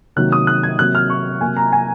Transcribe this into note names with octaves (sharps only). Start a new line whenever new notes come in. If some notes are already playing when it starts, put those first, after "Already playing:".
C3 D#3 F#3 A#3 F#6
D#6
F#6
G#6
C3 F#3 A#3 F#6
F6
C#6
C3 F#3 A#3 G#5
A#5
G#5